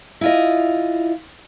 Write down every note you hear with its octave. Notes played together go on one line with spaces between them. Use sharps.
E4 F4 D#5